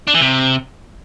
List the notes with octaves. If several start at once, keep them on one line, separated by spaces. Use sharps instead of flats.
D4
E3
C3